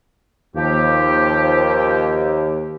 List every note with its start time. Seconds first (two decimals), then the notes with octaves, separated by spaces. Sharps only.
0.56 D#2 F3 G4